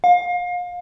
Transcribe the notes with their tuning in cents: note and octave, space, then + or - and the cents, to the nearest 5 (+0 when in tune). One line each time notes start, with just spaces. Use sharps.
F5 +30